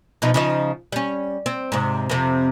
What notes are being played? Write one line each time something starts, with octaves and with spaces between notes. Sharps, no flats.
B2 F3 D#4
C#3 F3 D#4
G3 C#4
C4
G#2 C3
F2 C3